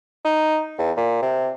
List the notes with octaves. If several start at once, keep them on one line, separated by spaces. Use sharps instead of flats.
D#4
E2
A#2
C3